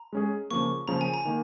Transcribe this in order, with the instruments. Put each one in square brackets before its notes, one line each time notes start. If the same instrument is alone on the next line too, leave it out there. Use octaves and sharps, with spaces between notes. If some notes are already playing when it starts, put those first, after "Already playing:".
Already playing: [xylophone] A#5
[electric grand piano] G#3 C#4 G#4
[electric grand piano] C#3 F3 A#3 [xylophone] C#6
[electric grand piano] C#3 F3 A#3 [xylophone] A#5
[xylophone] G#5
A#5
[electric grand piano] D#3 A#3